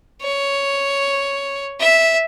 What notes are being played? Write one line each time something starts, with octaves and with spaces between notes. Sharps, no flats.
C#5
E5